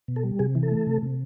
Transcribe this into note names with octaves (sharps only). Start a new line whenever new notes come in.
B2
A4
G3
C3 G#4
E3
A4
A3
C3
C3